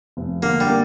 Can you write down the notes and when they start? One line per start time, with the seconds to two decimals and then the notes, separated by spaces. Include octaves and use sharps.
0.17 F1
0.43 D3 A#3
0.60 G3
0.69 A#3